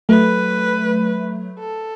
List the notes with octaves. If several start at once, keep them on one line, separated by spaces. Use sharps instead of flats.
F#3 A3 B4
A4